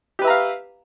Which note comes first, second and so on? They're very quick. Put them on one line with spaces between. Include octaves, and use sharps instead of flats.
G4 B4 E5 A#5 F5